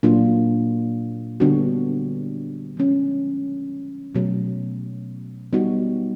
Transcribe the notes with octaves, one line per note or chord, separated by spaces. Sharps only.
A#2 F#3 A#3 D4 F4
D3 G3 B3 D4 F#4
F3 G#3 C#4
B2 F#3 A3
G3 B3 D#4 F#4